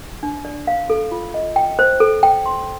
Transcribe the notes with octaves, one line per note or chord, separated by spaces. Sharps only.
D4
D5
F5
A4
F4
D#5
G5
C5
A4
G5
C6